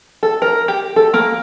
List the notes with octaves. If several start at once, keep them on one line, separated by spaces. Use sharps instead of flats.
A4
A#4
G4
A4
A#3